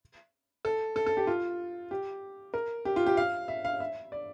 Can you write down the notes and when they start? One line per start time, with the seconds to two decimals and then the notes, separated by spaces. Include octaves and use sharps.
0.65 A4
0.96 A4
1.06 A4
1.17 G4
1.27 F4
1.91 G4
2.54 A#4
2.85 G4
2.96 F4
3.06 G4
3.17 F5
3.48 E5
3.65 F5
3.80 E5
4.12 D5